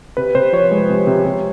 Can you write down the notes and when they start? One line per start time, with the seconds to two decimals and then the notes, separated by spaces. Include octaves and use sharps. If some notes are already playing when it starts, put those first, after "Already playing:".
0.17 C3 B4
0.35 C3 C5
0.53 F3 C#5
0.71 G#3
0.90 C3
1.07 C3
1.25 C3